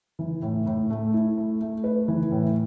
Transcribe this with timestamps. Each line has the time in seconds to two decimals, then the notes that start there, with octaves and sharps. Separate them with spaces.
0.19 E3
0.42 A2
0.66 A2
0.90 A3
1.14 E4
1.38 A3
1.61 A3
1.84 B4
2.08 E3
2.31 A2